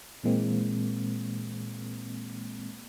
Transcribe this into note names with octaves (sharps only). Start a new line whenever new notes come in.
A#2 E3 G#3 A#3 C4